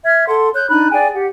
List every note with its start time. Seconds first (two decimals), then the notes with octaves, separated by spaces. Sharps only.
0.04 E5 F6 G#6
0.27 A4 F#5 C6
0.54 C#5 F#6 G6
0.70 D4 D#4 B5 F#6
0.92 G#4 D5 G5 G#5
1.14 G4 F#5